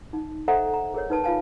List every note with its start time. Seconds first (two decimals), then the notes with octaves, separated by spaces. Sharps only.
0.13 D#4
0.48 A4 C5 D#5 E5 F#5 A#5
0.73 A#5
0.94 G#4 A#4 C#5
1.10 D#4 B4 A5
1.24 F4 B4 F5 G#5 A5